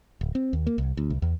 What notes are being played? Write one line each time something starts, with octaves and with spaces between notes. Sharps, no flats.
D1
C4
D#2
A#3
C2
D2
C2
E2